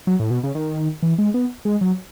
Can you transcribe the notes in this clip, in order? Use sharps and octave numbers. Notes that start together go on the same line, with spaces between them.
F#3
A2
B2
C#3
D#3
E3
G#3
B3
G#3
F#3